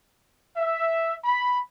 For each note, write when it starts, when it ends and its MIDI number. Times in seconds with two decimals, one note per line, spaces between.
0.57 1.14 76
1.25 1.60 83